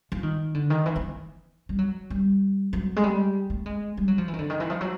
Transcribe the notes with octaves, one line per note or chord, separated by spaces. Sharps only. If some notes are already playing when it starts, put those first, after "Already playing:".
F3
D#3
D3
D#3
E3
E3
G3
F#3
G3
F#3
G#3
G3
A3
G#3
G3
F#3
F3
E3
D#3
D3
D#3
E3
F3
F#3